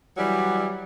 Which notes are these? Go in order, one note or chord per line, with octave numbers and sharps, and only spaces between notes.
E3 F#3 G3